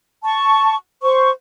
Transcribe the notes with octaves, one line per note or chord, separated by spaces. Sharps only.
A5 C#6
C5 C#6